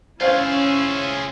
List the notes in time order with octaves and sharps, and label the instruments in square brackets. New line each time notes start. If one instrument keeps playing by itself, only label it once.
[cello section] C#4 E4 [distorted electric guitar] F4 G#4 [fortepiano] C5 F5 [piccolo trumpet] E6